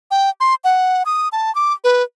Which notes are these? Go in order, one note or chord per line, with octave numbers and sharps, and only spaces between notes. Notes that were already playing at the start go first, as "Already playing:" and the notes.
G5
C6
F#5
D#6
A5
D6
B4